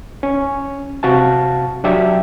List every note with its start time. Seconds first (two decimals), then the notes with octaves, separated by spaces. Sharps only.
0.23 C#4
1.03 C3 F#4 F5 A5
1.84 F#3 D4 G4 E5